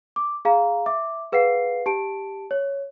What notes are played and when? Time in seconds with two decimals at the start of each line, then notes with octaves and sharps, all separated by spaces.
0.16 D6
0.45 G#4 F5 A#5
0.86 E5 D6
1.32 G#4 B4 F5 F#5 C7
1.86 G4 A5 D7
2.51 C#5